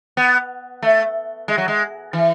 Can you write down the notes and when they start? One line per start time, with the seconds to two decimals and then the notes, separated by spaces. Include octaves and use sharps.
0.17 B3
0.82 A3
1.48 G#3
1.58 F#3
1.68 G#3
2.13 E3